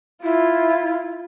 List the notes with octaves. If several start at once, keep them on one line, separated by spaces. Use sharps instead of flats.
E4 F4